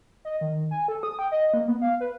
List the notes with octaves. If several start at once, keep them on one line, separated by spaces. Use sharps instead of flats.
D#5
D#3
G#5
A4
D#6
G5
D#5
A#3
B3
F5
B4